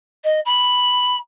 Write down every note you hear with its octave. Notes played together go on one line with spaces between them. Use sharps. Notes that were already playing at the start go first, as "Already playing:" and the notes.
D#5
B5